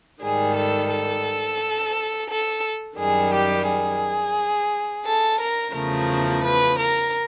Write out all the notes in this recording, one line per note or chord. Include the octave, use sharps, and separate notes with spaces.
G#2 D#3 G3 G#4
A4
A4
A4
F#2 D#3 G3 G#4
G4
G#4
A4
A#4
E2 C#3 F3 A3 A#4
B4
A#4